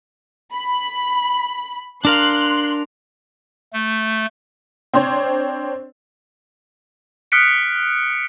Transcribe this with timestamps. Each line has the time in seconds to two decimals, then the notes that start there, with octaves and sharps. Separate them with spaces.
0.53 B5
2.05 D4 A#4 F5 C6 F#6
3.73 A3
4.94 C4 D4 C5 C#5
7.32 D#6 F6 F#6 B6 C#7 D7